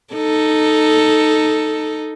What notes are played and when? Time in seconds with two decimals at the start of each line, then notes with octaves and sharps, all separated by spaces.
0.14 D#4 A4